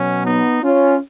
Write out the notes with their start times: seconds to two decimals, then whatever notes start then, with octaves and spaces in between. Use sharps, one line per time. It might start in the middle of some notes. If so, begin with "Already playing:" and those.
Already playing: B2 F#3 C#4
0.25 B3 D#4
0.63 C#4 F4